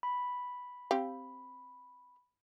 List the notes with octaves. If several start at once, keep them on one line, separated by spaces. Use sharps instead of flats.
B5
C4 G4 F5